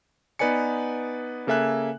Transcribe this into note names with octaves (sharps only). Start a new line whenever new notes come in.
B3 D#4 B4 D5 G#5 C#7
C#3 A#3 A4 E5 G#5 F#6